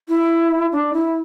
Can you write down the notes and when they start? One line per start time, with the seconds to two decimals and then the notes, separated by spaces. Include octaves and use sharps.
0.09 E4
0.72 D4
0.93 E4